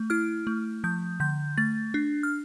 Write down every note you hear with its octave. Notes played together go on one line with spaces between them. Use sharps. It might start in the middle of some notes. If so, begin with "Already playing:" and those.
Already playing: A3
E4 F6
A3
F3 G6
D3 G6
A3 A6
D4
F6